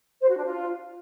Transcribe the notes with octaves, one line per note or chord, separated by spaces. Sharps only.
C5
F#4
D4
F4